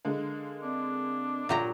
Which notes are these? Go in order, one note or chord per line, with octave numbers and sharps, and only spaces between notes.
D3 G#3 A#3
C4 D4
A#2 F#3 F4 G4 A#5